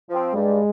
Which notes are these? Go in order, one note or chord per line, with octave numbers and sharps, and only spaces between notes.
F3 C4
G2 G#3